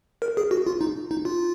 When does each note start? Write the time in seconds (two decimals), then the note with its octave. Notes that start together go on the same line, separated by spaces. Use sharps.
0.22 A#4
0.37 G#4
0.51 F#4
0.67 F4
0.81 D#4
1.11 D#4
1.25 F4